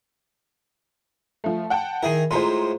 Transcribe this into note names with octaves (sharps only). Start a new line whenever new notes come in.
F3 A3
F#5 G5 A5
D#3 E4 G#4 A#4
A2 G#3 F4 C5 A#5 C6